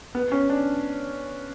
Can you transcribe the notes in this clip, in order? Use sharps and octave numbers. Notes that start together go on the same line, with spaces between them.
B3
C#4
D4